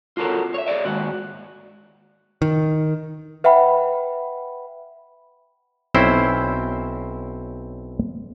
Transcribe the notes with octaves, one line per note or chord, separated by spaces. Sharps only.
F4 F#4 A4 A#4 C#5
C#5 E5
G#4 C#5 D5 E5
D#2 G#2 F#4
D#3
B4 E5 F#5 G5 B5
B1 C4 C#4 E4 C5